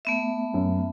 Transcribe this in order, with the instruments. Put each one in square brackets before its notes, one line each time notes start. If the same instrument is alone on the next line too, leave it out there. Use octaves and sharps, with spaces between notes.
[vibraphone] A3 B3 E5
[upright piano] F#2